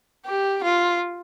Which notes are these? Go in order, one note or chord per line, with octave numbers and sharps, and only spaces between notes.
G4
F4